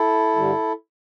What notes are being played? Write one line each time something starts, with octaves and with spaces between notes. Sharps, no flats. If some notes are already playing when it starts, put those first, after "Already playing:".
Already playing: E4 A4
G2 D3 G3